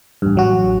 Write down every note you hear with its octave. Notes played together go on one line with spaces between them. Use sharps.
A1 G2
A1 F#3 F#4